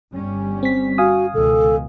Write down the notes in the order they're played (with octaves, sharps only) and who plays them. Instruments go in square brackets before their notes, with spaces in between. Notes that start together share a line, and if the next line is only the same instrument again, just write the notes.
[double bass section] G1 G3 C#4
[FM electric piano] C4 B6
[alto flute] F#4 [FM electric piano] F5 G#5 D#6
[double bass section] C#2 B2 D#3 [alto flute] A4